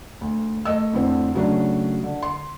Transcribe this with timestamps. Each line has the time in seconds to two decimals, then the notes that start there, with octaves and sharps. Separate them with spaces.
0.21 D2
0.65 A3 D#5 E6
0.93 F2 A2 D3 C4
1.34 C#3 F#3 A3 D4
2.04 D3
2.22 C6